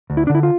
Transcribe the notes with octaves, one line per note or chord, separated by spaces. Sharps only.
D2
E4
D4
D3
E4
F4